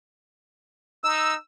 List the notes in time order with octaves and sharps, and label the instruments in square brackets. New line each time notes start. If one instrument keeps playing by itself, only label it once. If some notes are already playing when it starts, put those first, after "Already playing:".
[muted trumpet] D#4 [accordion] E6